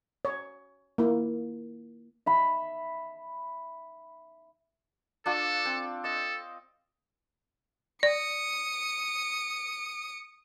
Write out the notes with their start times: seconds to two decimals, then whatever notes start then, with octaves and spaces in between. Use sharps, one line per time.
0.25 C#5
0.98 A#3 E4
2.26 E5 B5
5.26 D4 F4 A4 C#6
5.65 C4
6.04 A4 D#5
8.03 D5 D#6 C#7